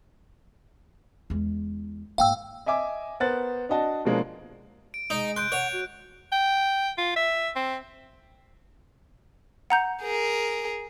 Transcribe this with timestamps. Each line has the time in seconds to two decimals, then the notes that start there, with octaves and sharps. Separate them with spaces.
1.30 E2 G#3
2.18 G#2 A#3 F5 G5 E6
2.66 D#5 E5 G#5 D6 E6
3.20 B3 A#4 C5 F#6 A6
3.69 D4 F#4 D#5 A5
4.05 B2 F3 G#3 A#3 D4
4.94 D7
5.10 G#3 D#4
5.36 C6 F#6 G6 D7
5.52 C#5 F#5
5.73 F#4
6.32 G5
6.98 F4
7.16 E5
7.55 C4
9.70 F#5 A#5 G6
10.02 G#4 A#4